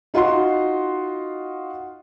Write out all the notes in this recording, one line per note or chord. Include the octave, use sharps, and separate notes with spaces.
D#4 F4 F#4 D#5 F#5 C6